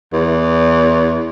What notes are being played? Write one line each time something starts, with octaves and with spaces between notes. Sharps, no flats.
E2